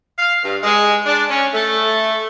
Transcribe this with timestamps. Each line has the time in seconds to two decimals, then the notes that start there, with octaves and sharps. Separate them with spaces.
0.19 F5
0.44 G2
0.63 G#3
1.06 D4
1.30 C#4
1.54 A3